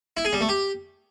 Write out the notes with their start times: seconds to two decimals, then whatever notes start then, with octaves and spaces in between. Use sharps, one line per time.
0.17 E4
0.25 G#4
0.33 G3
0.41 A3
0.49 G4